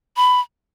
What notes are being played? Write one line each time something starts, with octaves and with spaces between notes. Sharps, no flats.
B5